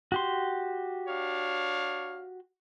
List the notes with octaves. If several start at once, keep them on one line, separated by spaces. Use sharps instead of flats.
F#4 G4 C6
D4 C#5 F5